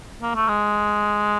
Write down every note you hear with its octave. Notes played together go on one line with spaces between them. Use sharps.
A#3
A3
G#3